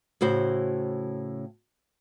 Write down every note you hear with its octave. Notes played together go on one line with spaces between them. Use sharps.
A2 C#3 F#4 C5